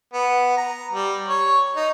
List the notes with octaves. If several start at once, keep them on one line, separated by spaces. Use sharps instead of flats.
B3
A#5
G3
C#5
D#4